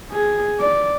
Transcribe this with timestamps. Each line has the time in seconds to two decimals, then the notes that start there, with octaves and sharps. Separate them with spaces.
0.12 G#4
0.60 D5